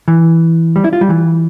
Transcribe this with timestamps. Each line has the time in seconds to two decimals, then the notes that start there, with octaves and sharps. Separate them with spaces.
0.08 E3
0.76 G3
0.84 E4
0.93 F4
1.01 G3
1.09 E3